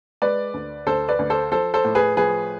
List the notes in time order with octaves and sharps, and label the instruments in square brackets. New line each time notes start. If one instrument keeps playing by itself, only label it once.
[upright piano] G#3 B4 D5
D2
D2 A4 C5
B4 D5
D2
A4 C5
F3 A4 C5
A4 C5
A2
G#4 B4
F3 G#4 B4